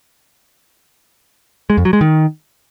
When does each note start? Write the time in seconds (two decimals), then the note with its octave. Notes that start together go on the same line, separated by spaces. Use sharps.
1.70 G#3
1.77 F2
1.85 F#3
1.93 G#3
2.01 D#3